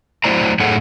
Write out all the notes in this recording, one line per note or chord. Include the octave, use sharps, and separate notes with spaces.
F#3 A3 E4 C5 D5 A#5
F#2 A2 G#4 A4 C#5 F#5